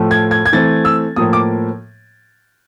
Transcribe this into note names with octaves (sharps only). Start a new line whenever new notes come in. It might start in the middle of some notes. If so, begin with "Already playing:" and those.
Already playing: A2 F3 A3
G#6
G#6
G#6
E3 A3 C4 A6
E6
A2 F3 A#3 D#6
D6